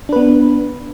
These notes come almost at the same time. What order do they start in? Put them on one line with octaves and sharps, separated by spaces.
D4 B4 B3